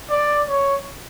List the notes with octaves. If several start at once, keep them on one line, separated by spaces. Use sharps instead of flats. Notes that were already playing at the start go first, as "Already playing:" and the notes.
D5
C#5